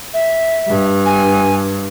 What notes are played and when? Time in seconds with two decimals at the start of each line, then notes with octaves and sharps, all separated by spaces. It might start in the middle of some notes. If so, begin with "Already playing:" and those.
0.14 E5
0.68 G2
1.06 G#5